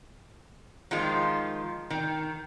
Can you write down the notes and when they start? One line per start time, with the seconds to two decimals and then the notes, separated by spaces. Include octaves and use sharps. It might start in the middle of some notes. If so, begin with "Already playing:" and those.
0.91 D#3 F3 G#3 F4
1.90 D#3